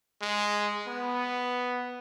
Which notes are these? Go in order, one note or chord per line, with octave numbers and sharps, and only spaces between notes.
G#3
B3